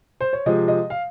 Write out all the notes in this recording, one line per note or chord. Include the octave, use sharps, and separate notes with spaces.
C5
C#5
C3 F3 G#3 D#5
D#5
F5